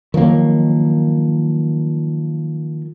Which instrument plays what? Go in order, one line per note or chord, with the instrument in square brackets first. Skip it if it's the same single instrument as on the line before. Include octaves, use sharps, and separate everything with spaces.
[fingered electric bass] D#3 F3 F#3 A#3